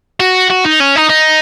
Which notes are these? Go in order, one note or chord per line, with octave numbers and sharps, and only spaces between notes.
F#4
F#4
D#4
C#4
D#4
D#4